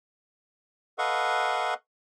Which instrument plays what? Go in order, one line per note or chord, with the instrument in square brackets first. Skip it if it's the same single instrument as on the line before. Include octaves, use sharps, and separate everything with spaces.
[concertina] A4 B4 D#5 F5 F#5 C#6